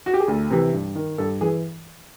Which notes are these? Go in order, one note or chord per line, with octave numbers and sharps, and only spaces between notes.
F#4
G4
G#4
D2 A4
C3 E3
G2
D#3
G2 A4
E3 G#4